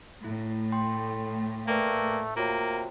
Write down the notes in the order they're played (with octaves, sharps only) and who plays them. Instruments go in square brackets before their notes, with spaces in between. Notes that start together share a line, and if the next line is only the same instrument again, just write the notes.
[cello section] A2 [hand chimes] E4
[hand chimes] G5 C6
[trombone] A3 [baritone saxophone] A#3 [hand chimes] B4 D5 G5
[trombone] C3 [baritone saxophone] A#3 [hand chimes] F4 F#4 C#5